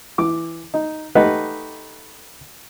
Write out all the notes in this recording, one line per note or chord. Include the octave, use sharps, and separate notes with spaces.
E3 D6
D#4
A3 D#4 G4 B4 D#5 F#5